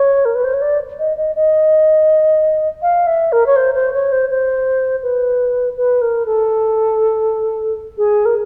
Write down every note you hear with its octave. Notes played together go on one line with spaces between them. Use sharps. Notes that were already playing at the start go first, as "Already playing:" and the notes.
Already playing: C#5
A#4
B4
C5
C#5
D5
D#5
D#5
D#5
F5
E5
A#4
C#5
C5
C5
C#5
C5
C5
B4
B4
A#4
A4
G#4
A#4